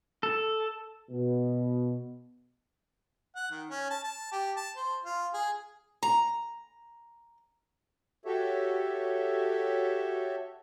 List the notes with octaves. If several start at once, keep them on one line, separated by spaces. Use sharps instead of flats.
A4
B2
F#5
D#3
C#4
A5
A5
G4
A5
C5
F4
G#4
A#5
F#4 G4 A4 C#5 E5